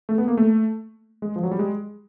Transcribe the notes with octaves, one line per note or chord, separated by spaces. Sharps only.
A3
B3
A#3
A3
G#3
F3
F#3
G3
G#3